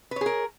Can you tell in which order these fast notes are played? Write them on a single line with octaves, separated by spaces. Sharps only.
B4 C#5 G#4 A#4